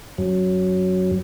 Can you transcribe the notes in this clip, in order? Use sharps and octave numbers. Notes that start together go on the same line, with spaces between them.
F#2 F#3